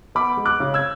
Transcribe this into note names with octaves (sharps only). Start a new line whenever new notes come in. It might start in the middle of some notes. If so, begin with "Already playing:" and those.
B3 B5 D6
G#3
D6 F#6
C#3
E6 G#6